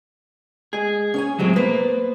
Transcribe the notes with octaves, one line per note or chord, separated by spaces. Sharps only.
G#3 G#4
C#4 C#5 G#5
A2 C3 F3 F#3 G#3 C4
A#3 B3 B4 C5